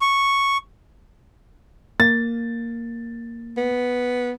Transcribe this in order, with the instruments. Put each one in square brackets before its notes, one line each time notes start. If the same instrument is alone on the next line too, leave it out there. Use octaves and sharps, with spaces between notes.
[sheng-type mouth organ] C#6
[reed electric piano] A#3 [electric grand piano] A6
[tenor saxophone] B3